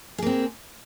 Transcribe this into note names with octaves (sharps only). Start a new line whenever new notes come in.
A#3 C4 G#4